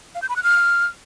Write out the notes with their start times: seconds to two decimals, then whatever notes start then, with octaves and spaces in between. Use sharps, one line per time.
0.15 F5
0.22 G6
0.29 B5
0.36 F#6
0.43 F6